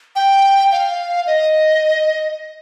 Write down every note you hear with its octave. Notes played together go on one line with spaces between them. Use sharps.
G5
F5
D#5